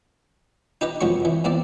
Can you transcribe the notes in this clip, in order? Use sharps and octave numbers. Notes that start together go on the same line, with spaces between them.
D#4 G4 B4 D#5
C2 F2 F#3 G#3 C#6
E3
E2 A#3 C4 D5